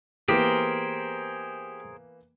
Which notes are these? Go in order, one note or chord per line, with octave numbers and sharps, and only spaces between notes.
E3 A#3 B3 G4 G#4 A#4 C5